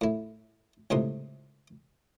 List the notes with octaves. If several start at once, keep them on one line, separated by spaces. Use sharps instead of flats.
A2 E4
C#2 A2 C3 D#4 C6